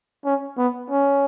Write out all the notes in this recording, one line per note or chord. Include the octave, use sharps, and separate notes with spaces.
C#4
B3
C#4